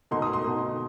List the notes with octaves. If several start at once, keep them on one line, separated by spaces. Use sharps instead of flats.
B2 A3 D#4 C6
D#6
C6
B2 A3 D#4